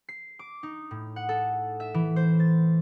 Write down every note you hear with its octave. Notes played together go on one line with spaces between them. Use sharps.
C7
D6
D#4
A2
F#5
A4
E5
E3
C5
A6